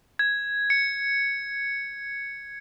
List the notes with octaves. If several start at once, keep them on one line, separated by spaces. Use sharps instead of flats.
G#6
C#7